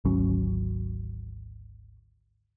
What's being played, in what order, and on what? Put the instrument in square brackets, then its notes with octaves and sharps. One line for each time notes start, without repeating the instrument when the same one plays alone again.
[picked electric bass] G#1 D2 F#3 C#4